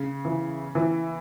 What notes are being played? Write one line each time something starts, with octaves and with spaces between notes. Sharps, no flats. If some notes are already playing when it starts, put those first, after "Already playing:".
Already playing: C#3
E3
E3